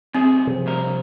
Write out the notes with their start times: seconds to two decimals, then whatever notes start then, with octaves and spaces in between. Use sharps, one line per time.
0.15 F#2 C3 C4 G#4
0.47 C3 F3
0.66 C#2 G2 A#4